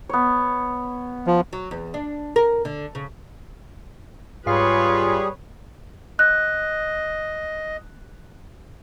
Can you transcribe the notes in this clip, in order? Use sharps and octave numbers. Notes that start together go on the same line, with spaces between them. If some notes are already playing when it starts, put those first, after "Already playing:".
B3 C#5
F3
F#3
E2
D4
A#4
D3
C#3
G#2 G3 F4 G#4 B4 C#5 F5 C7
D#5 F#6